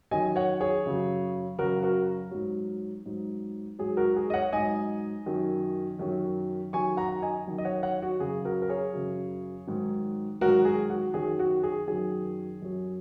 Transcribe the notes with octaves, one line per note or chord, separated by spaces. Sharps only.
F#2 D#3 F#3 D#5 G#5
C#5 F#5
G#4 C#5
F#2 C#3 F#3
F#2 C#3 F#3 F#4 A#4
F#4 A#4
G#2 F#3
G#2 F#3
G#2 F#3 G#4
F#4 A#4
G#4
D#5
C#5 F#5
G#2 F#3 D#5 G#5
F#2 D#3 F#3
F#2 D#3 F#3
F#2 D#3 F#3 G#5 C#6
F#5 A#5
D#5 G#5
F#2 D#3 F#3
D#5
C#5 F#5
C#5 F#5
F#4
F#2 C#3 F#3 G#4
F#4 A#4
A#4
G#4 C#5
F#2 C#3 F#3
G#2 D#3 F#3
G#2 D#3 F#3 F#4 A#4
G#4
F#4
F#2 D#3 F#3 G#4
F#4
G#4
F#2 D#3 F#3 G#4
F#2 F#3